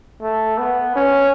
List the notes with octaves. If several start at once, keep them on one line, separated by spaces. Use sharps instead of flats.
A3
B3
C#4